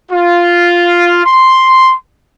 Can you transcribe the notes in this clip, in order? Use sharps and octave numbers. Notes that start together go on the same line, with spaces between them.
F4
C6